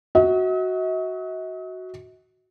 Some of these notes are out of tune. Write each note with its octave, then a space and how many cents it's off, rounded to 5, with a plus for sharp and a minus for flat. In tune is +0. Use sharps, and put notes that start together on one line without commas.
F#4 +0 D#5 +45